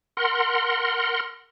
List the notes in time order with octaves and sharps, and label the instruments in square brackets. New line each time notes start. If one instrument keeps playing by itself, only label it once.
[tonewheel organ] A#4 F#5 C6